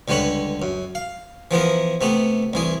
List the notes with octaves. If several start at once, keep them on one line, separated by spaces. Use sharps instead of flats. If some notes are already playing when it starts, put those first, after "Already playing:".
C#2 D3 G3 B4 C#5 B5
F#2
F5
E3 F3 B3 A#4
C3 A3 B3 G4
C2 E3 G#4